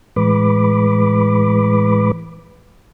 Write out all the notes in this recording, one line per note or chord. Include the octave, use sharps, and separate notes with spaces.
A2 E3 G#3 B4 B5 D6